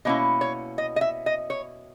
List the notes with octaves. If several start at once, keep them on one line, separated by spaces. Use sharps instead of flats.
B2 A#3 C#4 E4 D#5
C#5
D#5
D#5
E5
D#5
C#5